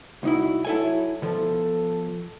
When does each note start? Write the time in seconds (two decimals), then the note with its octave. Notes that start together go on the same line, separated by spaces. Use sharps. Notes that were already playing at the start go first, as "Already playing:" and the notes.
0.23 C2 D#4 E4 F#4
0.65 F#3 E4 A4 G#5
1.22 B2 F3 A4